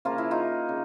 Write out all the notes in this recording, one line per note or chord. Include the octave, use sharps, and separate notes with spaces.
C#3 F3 A#3 F4
E4
D#4 F4
C#3